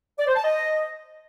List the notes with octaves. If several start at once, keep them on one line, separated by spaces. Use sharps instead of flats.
D5
C5
A5
D#5